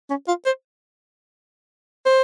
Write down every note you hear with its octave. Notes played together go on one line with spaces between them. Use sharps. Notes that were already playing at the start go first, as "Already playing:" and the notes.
C#4
F4
C5
C5